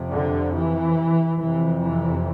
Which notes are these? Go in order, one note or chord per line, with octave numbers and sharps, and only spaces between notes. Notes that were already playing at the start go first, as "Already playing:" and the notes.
Already playing: F2 C3
D3
E3
F2 C3 E3
E3